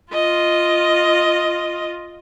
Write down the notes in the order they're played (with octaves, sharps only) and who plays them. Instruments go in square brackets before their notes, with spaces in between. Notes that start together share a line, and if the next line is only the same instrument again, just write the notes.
[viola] F4 D#5